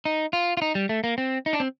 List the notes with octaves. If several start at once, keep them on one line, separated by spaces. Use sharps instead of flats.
D#4
F4
F4
D#4
G3
A3
A#3
C4
D#4
D4
C4